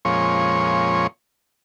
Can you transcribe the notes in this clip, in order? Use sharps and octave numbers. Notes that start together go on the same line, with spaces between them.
F2 A#2 F3 G#3 C#4 C#5